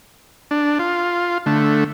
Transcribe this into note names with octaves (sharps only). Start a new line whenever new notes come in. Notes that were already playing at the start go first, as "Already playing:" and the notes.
D4
F4
D3 A3